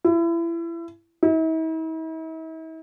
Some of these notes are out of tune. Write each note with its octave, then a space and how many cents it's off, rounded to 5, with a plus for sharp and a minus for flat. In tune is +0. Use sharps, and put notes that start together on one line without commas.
E4 +30
E4 -45